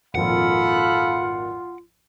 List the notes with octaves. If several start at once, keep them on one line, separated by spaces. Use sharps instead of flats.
G#1 F2 A#2 F4 A4 F5 F#5 B5